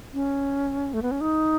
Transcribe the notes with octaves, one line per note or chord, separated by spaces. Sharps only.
C#4
A3
B3
C#4
D#4